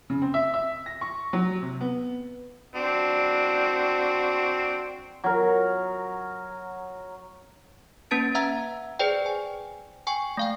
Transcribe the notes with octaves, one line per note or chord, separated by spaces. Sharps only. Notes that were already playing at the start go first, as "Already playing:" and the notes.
C#3
C4
E5
E5
A#6
C#6
F#3
C3
B3
C4 D4 F#4
F#3 A#4
A#3 C#4 B4 A5 A6 D7
E5 F#5 A#5 E6 G#6
G#4 B4 C5 D5 G5
G#5
G5 G#5 C#6
A3 F5 G5